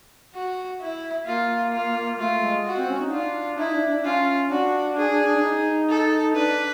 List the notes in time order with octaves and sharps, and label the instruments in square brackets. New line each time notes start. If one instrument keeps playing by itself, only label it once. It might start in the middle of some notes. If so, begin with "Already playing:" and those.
[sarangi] F#4
E4
[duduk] A#3 [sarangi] F4
[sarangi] F4
[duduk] A3 [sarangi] F4
[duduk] G#3
[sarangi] F#4
[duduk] C4
C#4
D#4
[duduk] D4 [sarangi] F4
[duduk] D#4 [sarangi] E4
[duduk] D4
D4
[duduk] C#4 [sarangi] F4
[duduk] D4 [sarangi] F#4
[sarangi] G#4
[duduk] D4
D#4
[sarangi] A4
[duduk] D4 [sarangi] B4